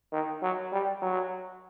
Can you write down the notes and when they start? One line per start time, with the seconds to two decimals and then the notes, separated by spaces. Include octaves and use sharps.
0.12 D#3
0.42 F#3
0.72 G3
1.02 F#3